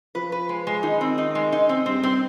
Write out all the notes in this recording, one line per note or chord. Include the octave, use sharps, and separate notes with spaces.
F3 B4
B4
G#3
G#3
D#3 D#4
C4
D#4
G#3
D#4
C4
G2 C4
C4